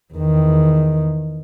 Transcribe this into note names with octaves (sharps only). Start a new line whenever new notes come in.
E2 D#3